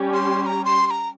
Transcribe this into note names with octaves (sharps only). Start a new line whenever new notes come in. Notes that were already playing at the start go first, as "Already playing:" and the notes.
Already playing: G3 C#4 G4
C6
C6
A#5
C6
C6
A#5